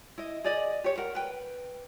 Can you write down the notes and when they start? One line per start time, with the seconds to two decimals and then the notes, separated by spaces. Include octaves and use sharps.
0.18 E4 D#5
0.44 G#4 D5 D#5
0.84 G4 C#5
0.98 A#4 F#5
1.15 B4 G5